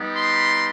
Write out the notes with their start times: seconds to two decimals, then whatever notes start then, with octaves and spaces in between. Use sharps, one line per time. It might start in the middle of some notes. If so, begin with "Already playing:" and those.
Already playing: G3 B3 D#4
0.15 C6